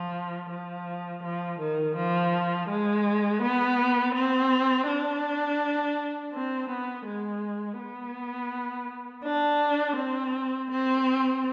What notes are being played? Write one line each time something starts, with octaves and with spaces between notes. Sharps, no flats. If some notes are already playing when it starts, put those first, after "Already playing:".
Already playing: F3
F3
F3
D#3
F3
G#3
B3
C4
D4
C4
B3
G#3
B3
D4
C4
C4